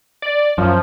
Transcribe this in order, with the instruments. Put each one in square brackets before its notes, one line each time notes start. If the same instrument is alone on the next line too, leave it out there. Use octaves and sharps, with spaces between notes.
[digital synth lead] D5
[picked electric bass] F#2 [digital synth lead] F3